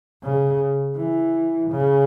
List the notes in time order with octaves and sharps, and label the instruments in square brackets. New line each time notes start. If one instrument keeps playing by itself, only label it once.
[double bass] C#3
E3
C#3